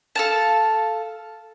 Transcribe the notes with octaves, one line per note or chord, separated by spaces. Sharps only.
A4 F5 A5